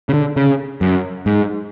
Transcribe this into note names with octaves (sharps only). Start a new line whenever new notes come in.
C#3
D3
C#3
F#2
G#2